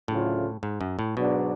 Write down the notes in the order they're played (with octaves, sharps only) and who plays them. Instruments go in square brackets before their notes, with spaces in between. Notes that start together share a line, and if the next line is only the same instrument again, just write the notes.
[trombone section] D2 C#3 F#3 A3 F4 [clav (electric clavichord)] A2
[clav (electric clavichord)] G#2
F#2
A2
[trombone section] G#2 F#3 B3 D4 [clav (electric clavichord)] B2